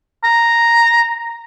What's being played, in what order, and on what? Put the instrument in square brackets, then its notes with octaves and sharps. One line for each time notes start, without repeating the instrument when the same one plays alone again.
[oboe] A#5